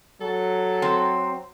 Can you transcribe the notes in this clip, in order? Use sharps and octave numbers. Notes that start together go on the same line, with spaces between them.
F#3 A4
C4